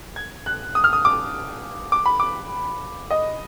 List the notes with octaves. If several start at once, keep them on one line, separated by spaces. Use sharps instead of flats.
G#6
F#6
D#6
F6
D#6
D6
D6
B5
D6
D#5